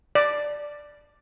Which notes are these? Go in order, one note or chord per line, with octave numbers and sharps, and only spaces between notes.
D5